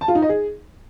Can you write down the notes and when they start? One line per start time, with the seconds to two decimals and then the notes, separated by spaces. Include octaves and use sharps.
0.01 A5
0.08 F4
0.15 D#4
0.22 D#5
0.29 G#4